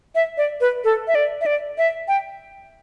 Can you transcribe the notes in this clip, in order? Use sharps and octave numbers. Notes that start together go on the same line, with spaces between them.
E5
D5
B4
A4
E5
D5
E5
D5
E5
G5